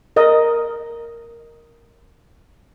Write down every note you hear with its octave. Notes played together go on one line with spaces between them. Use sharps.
A#4 D#5